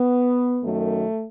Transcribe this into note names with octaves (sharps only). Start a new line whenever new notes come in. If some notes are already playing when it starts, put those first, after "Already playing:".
Already playing: B3
F#2 D#3 F#3 A3